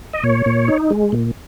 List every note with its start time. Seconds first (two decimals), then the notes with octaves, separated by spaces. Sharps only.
0.13 D#5
0.23 A#2 C#5
0.46 A#2
0.68 D#4
0.90 G#3
1.12 A#2